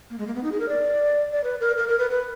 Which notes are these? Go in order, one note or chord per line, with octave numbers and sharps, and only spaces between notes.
A#3
G#3
A#3
B3
D#4
G#4
A#4
D5
D5
B4
A#4
A#4
A#4
B4
B4